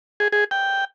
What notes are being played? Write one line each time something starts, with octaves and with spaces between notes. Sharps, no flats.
G#4
G#4
G5